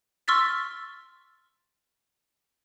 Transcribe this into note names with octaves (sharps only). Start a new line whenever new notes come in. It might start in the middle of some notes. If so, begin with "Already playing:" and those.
C6 C#6 E6 F6 A6 B6